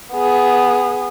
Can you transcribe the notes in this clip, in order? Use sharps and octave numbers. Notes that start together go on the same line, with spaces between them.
B3 G#4